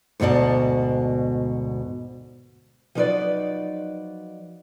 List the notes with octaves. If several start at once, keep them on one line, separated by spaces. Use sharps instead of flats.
D2 G#2 B2 D5 A5
F3 F#3 D#4 A#4 B4 D5